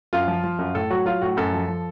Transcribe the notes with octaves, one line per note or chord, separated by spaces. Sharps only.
F#2 F4
F3
F3
F#2
A2 A4
F#3 F#4
F#3 F4
A2 F#4
F#2 A4
F3
F3